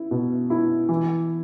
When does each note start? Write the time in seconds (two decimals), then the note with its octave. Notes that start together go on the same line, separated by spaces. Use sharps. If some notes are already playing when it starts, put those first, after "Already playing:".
Already playing: E4
0.11 B2
0.50 E4
0.89 E3